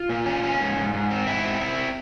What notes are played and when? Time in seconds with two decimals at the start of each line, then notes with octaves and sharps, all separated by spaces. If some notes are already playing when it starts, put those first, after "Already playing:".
Already playing: F4
0.09 A#2
0.26 C#4
0.43 C#4
0.61 G#2
0.77 G#2
0.93 G#2
1.11 C4
1.27 G#2 E4
1.44 C4
1.61 C4